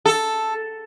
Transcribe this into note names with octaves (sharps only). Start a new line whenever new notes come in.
A4